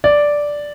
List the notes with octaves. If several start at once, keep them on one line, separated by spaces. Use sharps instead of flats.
D5